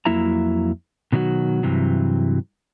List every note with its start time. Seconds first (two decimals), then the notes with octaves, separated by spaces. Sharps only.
0.05 F2 F#3 A#3 E4 E5 A#5
1.12 B2 D#3 F#3 D#4 F#4
1.63 G2 C3 E3 F#3